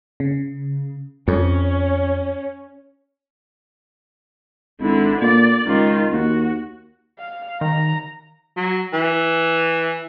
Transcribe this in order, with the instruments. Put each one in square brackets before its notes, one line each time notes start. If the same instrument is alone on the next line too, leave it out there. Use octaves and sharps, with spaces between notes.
[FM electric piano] C#3
[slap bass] F2 [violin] C#4
[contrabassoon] G#1 [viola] D3 E4
[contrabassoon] A#2 [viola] D5
[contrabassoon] C#2 [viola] D#3 F4
[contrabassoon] D#2 [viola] F#4
[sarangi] F5
[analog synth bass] D#3 [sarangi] A#5
[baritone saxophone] F#3
E3